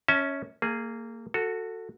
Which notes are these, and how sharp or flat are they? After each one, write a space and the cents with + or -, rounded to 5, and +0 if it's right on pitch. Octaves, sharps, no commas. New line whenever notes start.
C#4 +0 E5 -35 A5 +0
A#3 -25 G#4 +5
F#4 -10 A4 +20